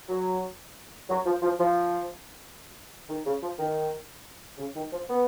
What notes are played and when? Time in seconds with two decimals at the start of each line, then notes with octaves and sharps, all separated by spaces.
0.09 F#3
1.08 F#3
1.26 F3
1.42 F3
1.59 F3
3.09 D#3
3.25 C#3
3.42 F3
3.58 D#3
4.58 C#3
4.75 D#3
4.92 F3
5.09 B3